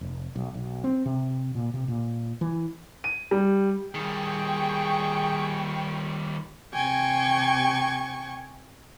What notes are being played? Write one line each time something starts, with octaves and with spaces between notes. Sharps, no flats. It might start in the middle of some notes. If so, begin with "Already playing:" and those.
F1
B1
B1
C4
C3
A#2
C3
A#2
E3
D#7
G3
D#3 G3 G#4 G5 C#6
C3 G5 G#5 C#6 G#6